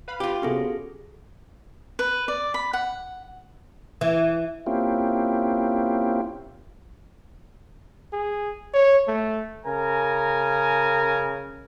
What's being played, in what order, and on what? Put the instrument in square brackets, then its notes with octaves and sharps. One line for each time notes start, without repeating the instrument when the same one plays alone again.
[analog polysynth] B4 F5 B5
[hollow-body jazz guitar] F4 G4
[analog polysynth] C3 B3 C#4 [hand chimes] F#4 G#4 A4
[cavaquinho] B4
D5
B5
F#5
[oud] E3
[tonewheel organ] A#3 C4 C#4 E4 F4 G4
[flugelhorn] G#4
C#5
A3
[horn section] C#3 A#4 G#5 A#5